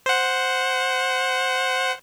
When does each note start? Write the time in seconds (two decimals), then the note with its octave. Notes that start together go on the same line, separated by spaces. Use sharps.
0.06 C5 F#5